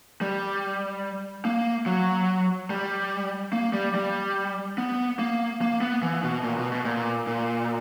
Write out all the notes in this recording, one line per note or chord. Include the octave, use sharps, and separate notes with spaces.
G3
A#3
F#3
G3
A#3
G3
G3
B3
A#3
A#3
B3
E3
B2
A#2
B2
B2
A#2
A#2